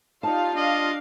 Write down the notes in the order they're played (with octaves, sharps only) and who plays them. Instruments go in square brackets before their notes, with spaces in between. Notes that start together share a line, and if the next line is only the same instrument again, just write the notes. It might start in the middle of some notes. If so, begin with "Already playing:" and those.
[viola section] D#4 G4 F5 [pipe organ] F4 [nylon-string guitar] D5 A5
[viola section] D4 F5 [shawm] D#5